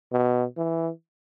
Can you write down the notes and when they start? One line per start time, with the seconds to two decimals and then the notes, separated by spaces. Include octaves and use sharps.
0.12 B2
0.58 E3